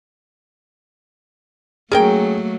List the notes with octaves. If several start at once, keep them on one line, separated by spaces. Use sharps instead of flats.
F#3 A3 A#3 C#4 G#4 A#4 G5